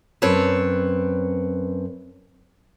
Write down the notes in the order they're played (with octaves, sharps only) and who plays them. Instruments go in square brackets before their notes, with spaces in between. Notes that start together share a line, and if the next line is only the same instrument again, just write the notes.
[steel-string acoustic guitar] F#2 C4 B4 C#5 A5